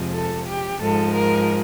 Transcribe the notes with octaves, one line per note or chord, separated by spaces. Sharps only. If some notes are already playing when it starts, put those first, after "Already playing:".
Already playing: F2 C3 F3 G#3
A4
G4
G#2 F3 G#3 A4
A#4